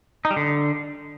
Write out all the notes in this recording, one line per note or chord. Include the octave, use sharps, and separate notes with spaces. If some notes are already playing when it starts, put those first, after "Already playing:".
D#4
G3
D3